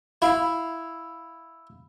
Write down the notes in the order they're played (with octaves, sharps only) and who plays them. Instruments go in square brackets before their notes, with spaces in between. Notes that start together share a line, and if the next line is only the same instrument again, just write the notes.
[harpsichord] E4 F5